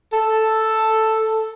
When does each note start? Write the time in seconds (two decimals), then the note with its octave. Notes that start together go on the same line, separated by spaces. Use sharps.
0.13 A4